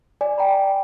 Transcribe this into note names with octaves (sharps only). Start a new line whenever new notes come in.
D5 G#5
G5 A#5 B5